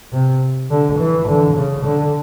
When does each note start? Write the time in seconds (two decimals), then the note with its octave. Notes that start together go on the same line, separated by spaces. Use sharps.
0.13 C3
0.70 D3
0.99 E3
1.28 D3
1.56 C#3
1.85 D3